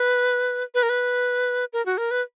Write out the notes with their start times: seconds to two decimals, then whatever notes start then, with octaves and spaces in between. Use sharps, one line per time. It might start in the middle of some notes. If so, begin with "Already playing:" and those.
Already playing: B4
0.74 B4
0.83 A#4
0.89 B4
1.73 A#4
1.86 F#4
1.98 A#4
2.11 B4